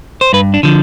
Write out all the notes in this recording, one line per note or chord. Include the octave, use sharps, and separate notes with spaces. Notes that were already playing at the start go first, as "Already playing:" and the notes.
C5
G2 B4
D4
D3 F3